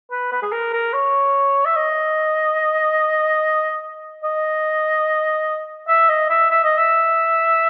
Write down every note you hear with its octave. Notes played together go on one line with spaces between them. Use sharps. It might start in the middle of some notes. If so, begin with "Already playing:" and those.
B4
B4
G#4
A#4
A#4
C#5
E5
D#5
D#5
E5
D#5
E5
E5
D#5
E5